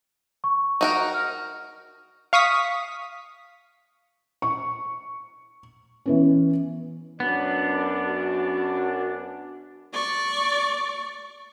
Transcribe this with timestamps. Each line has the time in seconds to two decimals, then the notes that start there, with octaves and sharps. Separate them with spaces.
0.44 C#6
0.81 D#4 F#4 A#4
1.14 F6
2.33 F5 C#6 D#6 B6
4.42 C#6
6.06 E3 B3 C#4
7.20 F#2 B3 D4
8.07 F#4
9.93 D5 C#6